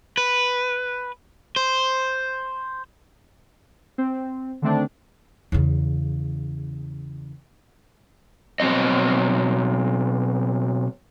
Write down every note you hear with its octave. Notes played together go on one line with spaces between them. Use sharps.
B4
C5
C4
D3 D#3 A3 C4 D4
E2 C#3
B2 F3 F#3 C4 D#5